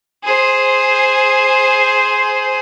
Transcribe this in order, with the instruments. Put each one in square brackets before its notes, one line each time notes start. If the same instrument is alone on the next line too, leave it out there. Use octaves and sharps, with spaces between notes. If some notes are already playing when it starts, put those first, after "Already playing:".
[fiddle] G#4 C5